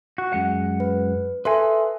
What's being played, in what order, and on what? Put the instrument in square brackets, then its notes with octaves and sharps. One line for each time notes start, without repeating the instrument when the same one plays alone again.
[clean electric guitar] F#4
F#2 G#3 F#5
[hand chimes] B4
[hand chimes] A4 E5 C6 [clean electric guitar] B4 G#5